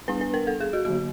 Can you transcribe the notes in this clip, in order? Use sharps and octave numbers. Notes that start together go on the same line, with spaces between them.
G3 B3 D4 B4
B4
A#4
A4
G#4
F#4
D3 F#3 A#3 F#4